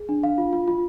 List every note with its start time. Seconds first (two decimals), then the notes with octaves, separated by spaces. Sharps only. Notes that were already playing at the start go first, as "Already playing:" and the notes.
Already playing: G#4
0.09 D4
0.23 F5
0.38 F4
0.53 F4
0.68 F4